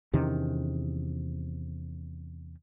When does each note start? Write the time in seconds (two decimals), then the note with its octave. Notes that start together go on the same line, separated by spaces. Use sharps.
0.13 E2 C3 D#3 C#4